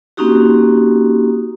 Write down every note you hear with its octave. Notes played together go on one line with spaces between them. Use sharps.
A#3 C4 C#4 D#4 F#4 G4